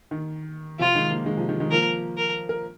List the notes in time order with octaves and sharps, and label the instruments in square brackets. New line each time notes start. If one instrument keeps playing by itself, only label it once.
[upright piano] D#3
[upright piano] C3 F3 [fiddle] F4
[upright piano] D#3 G#3
F3 A#3
D#3 G#3
C3 F3
D#3
D#3 G#3
[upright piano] F3 A#3 [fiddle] A#4
[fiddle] A#4
[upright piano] A#4